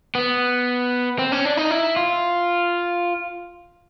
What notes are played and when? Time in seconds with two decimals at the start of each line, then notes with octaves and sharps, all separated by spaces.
0.15 B3
1.19 C4
1.32 C#4
1.45 D4
1.57 D#4
1.71 E4
1.96 F4